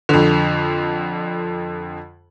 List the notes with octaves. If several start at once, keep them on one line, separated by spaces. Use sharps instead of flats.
F2 D3